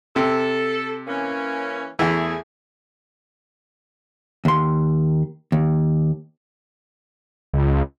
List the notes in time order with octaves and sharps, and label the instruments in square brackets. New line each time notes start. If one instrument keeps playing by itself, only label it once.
[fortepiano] C3 [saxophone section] A4
[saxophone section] E3 A#3 C#4
[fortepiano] E2 E3 [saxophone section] A3 E4 G#4
[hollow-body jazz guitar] D#2 C6
D#2
[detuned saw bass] C#2